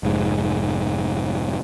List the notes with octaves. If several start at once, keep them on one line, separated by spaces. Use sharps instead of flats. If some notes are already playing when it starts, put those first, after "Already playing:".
F1 G#2